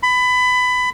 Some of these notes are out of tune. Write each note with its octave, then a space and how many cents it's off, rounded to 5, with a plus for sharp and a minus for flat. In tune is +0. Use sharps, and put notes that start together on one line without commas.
B5 +20